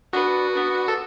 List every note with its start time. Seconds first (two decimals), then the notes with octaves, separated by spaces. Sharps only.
0.13 B3 D4 F#4 B4
0.53 B3 D4 B4
0.88 A4